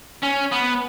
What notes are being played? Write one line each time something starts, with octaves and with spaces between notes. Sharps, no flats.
C#4
B3